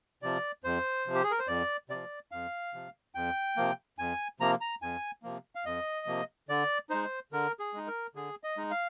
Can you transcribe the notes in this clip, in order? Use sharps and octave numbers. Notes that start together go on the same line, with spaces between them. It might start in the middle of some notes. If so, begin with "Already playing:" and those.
C3 F3 D5
F2 C5
C3 F3
G4
G#4
A#4
C5
F2 D5
C3 F3 D5
F2 F5
C3 F3
F2 G5
C3 F3 A#3
F2 G#5
C3 F3 A#3 A#5
A#5
F2 G#5
C3 F3 A#3
F5
F2 D#5
C3 F3 A#3
D3 D5
G#3 D#4 C5
D3 A#4
G#4
G#3 D#4
A#4
D3 G#4
D#5
G#3 D#4
F5